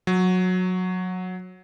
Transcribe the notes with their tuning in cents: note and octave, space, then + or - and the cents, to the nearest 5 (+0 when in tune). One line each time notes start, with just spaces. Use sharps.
F#3 -15